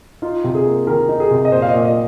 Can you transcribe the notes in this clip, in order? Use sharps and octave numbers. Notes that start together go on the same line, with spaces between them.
D#4 F4
C3
G#4
A#3
D#3 A#4
D#4
G#4
C3
D#5
A#2 C5
F5
D#5
A#2
D#5